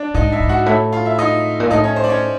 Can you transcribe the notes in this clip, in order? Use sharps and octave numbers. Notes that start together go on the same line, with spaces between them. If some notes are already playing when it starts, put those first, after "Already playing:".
Already playing: D4 D5
G#2 D#4 D#5
E4 E5
G#2
F#4 F#5
A2 E4 E5
F4 F5
E4 E5
D#4 D#5
A#2
A2 D#4 D#5
C#4 C#5
C5
D5
C#4 C#5